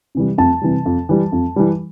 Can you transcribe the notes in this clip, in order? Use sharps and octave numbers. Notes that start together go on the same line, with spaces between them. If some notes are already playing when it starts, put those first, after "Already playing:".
C3 E3 G3
F2 A5
C3 E3 G3
F2
E3 G3
F2
E3 G3